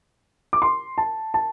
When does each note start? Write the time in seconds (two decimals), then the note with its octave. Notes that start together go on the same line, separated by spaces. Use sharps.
0.53 D6
0.62 C6
0.98 A5
1.34 A5